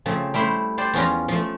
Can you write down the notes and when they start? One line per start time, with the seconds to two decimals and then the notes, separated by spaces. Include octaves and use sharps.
0.06 C#3 F3 A3 C4
0.34 G3 A3 E4 C5 B5 C6
0.78 C5 D5 G5
0.93 E2 F3 C#4 F4 A#5
1.28 F3 A3